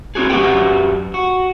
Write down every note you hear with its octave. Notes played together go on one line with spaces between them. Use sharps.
C4 E4 F#4 G#4
F#2 F#4 G4 B4 F#5 G5
F#4